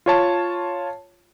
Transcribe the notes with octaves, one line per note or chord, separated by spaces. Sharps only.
F4 C#5 A5